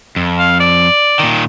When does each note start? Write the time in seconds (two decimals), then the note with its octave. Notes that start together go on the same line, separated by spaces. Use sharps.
0.16 F2
0.38 F5
0.60 D5
1.19 A#2 D#3